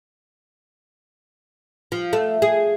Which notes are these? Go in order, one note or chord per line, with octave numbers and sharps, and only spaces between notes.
F3
A3
G#4